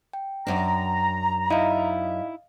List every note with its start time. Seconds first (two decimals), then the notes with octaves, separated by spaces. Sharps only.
0.13 G5
0.47 F#2 D4 A#5
1.50 D#4 E4 D#5 F5